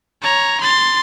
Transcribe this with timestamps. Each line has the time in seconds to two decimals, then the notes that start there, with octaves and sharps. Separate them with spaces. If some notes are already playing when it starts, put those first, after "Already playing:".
0.22 C#5 A#5
0.61 C6 A6